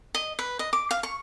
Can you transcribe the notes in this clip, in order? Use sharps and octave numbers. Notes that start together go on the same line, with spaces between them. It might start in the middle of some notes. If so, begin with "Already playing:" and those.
D#5
B4
D#5
D6
F5
C#6